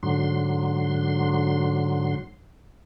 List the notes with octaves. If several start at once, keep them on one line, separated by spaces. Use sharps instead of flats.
G#2 D3 F#3 C6